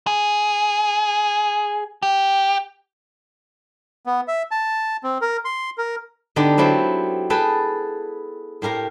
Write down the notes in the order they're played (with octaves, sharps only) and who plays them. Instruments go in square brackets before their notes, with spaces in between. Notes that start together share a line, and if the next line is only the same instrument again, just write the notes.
[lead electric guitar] G#4
G4
[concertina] B3
E5
A5
C4
A#4
C6
A#4
[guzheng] D3 B3 D#4 G4 A4 D5
F#3 B3 C4 E4 G4
G#4 A4 B4 E5 G5 A5
A2 G4 A#4 F5 A#5